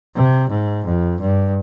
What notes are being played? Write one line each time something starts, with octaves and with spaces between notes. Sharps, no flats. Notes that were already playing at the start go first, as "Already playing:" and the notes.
C3
G#2
F2
G2